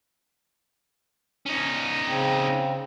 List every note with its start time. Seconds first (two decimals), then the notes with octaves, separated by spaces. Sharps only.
1.46 C#4 D#4
2.05 C#3 C4